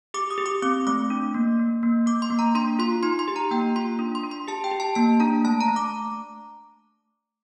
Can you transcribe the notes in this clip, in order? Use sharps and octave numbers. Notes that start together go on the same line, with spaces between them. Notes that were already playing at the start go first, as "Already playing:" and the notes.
G4 D6
D#6
G4
D6
C4 D6
A3 D6
D4
A#3
A#3
A#3
A#3 D6
C6
A#3
A#5
D4 C6
F4 C6
D#4 C6
C6
G4
A#5
A#3 G5
F4 C6
D4
C6
D4
C6
G4 A5
G5
G4
A5
A#3 A5
D4 A#5
A3 A5
A#5
A3
D6